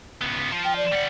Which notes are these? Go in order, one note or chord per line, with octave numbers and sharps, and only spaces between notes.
C#2 B3
F3
G5
D5
G3 F#5